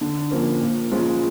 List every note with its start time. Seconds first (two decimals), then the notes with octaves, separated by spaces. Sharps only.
0.01 D3
0.31 F3 A#3 C#4
0.61 A#2
0.91 F3 G#3 C#4 F4